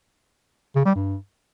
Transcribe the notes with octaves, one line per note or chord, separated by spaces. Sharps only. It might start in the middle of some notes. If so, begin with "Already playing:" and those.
C#3
G3
G2